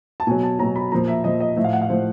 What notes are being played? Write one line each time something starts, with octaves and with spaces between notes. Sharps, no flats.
A5
B2 F#3 G#5
A5
B2 F#3 A#5
B5
A#2 F3 A#5
E5
A#2 F3 D#5
D#5
A2 F3 E5
F5
F#5
F5
A2 F3 C5